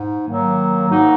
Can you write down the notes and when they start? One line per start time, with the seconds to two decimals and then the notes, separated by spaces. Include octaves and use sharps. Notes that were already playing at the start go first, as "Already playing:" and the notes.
Already playing: G#2
0.25 D#3 F#3 A#3
0.87 G#2 D#3 A#3 D#4 F#4